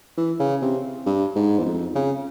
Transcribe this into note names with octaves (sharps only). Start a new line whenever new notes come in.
E3
C#3
C3
G2
G#2
E2
F2
C#3